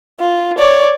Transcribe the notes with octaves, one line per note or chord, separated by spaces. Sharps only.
F4
C#5 D5